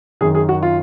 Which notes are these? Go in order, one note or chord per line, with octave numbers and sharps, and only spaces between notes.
F#2 D#3 G#4
G#4
F#4
F4